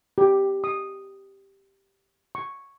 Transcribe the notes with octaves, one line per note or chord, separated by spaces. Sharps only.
G4
D#6
C#6